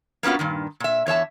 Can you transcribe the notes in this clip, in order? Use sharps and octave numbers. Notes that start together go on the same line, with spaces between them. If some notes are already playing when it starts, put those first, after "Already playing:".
A#3 B3 C#4 F4 F#4
G2 A#2 D#3
A#2 E5
E2 C#5 E5 A5